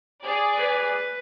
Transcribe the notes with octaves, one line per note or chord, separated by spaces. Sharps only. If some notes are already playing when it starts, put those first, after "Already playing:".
G#4 D5
B4